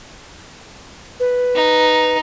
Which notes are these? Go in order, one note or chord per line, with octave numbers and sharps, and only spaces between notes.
B4
D#4